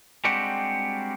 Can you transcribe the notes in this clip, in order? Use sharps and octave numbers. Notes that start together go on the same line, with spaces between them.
G3 G#3 C4 D4 F#4 G4